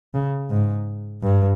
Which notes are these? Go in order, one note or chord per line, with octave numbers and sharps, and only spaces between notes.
C#3
G#2
G2